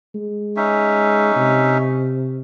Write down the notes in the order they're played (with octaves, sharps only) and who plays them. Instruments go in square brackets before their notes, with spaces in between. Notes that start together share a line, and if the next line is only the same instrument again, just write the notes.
[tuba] G#3
[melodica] C#4 D#4 E5
[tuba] C3